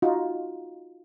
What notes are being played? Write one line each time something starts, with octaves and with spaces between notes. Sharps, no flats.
D#4 F4 F#4